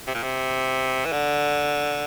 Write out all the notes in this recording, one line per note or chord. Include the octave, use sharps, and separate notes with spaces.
C3
A#2
C3
E3
D3